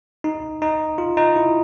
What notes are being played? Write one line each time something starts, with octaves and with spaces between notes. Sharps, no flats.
D#4
D#4
F4
D#4
E4